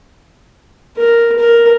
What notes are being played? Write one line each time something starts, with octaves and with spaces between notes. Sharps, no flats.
A#4
A#4